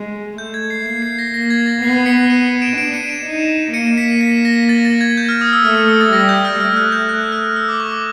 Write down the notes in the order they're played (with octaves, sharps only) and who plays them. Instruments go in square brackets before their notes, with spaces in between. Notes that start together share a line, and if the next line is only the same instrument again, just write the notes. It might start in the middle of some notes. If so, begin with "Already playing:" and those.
Already playing: [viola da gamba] G#3
[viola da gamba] A3 [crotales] G6
[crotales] G#6
C7
[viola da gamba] A#3 [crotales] C7
[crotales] C7
A#6
[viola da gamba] A#3 [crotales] A#6
[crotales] G#6
A6
[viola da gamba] B3 [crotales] C7
[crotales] B6 C#7
C#7 D#7
D7 E7
[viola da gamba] D4 [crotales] D7 E7
[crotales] C#7 D#7
D7 E7
[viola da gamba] D#4
[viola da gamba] A#3 [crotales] C#7 D#7
[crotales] B6 C#7
B6
A#6
A6
A6
G#6
G6
F6
D#6
E6
[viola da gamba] A3 [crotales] F6
[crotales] F6
D#6
A6
[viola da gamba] G3 [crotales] A#6
[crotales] G6
F6
[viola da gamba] A3 [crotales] F6
[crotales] F#6
G6
F#6
F6
E6
D6
C#6
D6